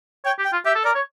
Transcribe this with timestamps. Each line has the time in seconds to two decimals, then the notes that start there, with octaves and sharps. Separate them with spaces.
0.25 C#5 G5
0.39 G4
0.45 G5
0.52 F4
0.65 G4 E5
0.75 A4
0.85 A#4 D5
0.95 C#5